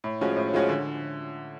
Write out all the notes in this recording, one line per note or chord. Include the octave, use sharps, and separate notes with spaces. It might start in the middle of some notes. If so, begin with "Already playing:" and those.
A2
F3 G#3 C#4 F#4
A2
F3 G#3 C#4 F#4
D3